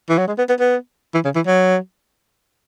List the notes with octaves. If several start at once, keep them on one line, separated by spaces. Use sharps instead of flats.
E3
F#3
G#3
B3
B3
B3
E3
C#3
E3
F#3